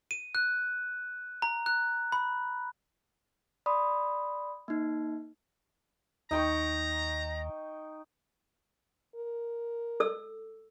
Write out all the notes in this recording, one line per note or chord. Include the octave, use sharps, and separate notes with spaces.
D#7
F#6
A#5
F#6
B5
D5 B5 C6 D#6
A#3 D#4
D#2 D#4 G5 A#5 C#6
A#4
A4 E6